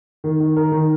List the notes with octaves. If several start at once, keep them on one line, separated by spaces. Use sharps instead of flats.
D#3
D#3
A#4
D#3